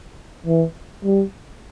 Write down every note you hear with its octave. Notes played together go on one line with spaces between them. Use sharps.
E3
G3